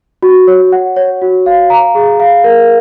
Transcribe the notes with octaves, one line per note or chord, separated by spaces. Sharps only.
F#4
C#5
F#5
C#5
F#4
F5
A#5
G#4
F5
A#4